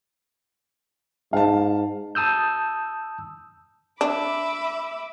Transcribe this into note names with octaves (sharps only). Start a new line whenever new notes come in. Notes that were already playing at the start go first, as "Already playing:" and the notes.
G#2 F5 A5
A5 D#6 E6 G6
D4 E5 B5 D6